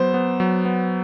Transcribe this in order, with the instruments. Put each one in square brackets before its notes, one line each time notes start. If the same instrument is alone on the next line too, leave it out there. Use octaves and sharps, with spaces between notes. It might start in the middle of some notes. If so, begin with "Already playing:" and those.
Already playing: [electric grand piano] F#3 B3 [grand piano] C5
[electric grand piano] B3
F#3
B3